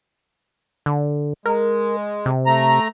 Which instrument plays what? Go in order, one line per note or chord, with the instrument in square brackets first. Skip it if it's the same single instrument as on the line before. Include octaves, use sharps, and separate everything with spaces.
[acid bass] D3
[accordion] G#3 [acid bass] A#4
[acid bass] C3
[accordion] A3 A#5